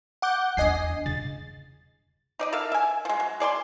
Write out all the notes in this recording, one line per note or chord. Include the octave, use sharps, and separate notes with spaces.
F#5 D6 G6
E2 D4 D#5 G#5 C7
C#3 A6
D#4 D5 D#5
A4 A#4 E5 F5
E5 G#5
F3 G#3
F#3
G#4 D5 G#5 C6